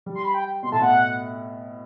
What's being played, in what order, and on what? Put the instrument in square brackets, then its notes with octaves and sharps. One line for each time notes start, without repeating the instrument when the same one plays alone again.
[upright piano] G3
[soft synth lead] C6
B5
G5
[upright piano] B2 [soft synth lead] C6
[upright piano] A2 [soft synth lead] A5
[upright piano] B2 [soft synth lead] F#5